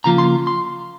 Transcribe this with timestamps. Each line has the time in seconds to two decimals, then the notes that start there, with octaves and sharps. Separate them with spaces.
0.04 C#3 F3 A#3 F4 A#5
0.18 C6
0.47 C6